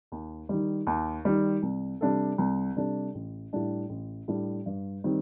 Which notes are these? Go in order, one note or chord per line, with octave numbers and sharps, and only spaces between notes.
D#2
D#3 G3
D#2
D#3 G3
C2
C3 G3 D4 A4
C2
C3 G3 D4 A4
A1
A2 G3 D4
A1
A2 G3 D4
G2
D#3 G3 C4